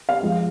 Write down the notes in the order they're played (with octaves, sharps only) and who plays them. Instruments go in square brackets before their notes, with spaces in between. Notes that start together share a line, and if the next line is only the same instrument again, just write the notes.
[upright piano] F5
F3 G#3